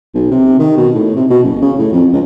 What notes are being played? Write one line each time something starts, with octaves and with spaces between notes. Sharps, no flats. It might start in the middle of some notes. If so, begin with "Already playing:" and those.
B1
C3
D#3
B2
A2
C3
B2
F#1
C#3
A2
F2
C#2